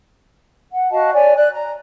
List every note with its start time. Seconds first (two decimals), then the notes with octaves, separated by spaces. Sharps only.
0.72 F#5
0.91 F#4 D#5 F5 A5
1.14 C#5 D5 G#5
1.37 D5 F#6
1.52 A#5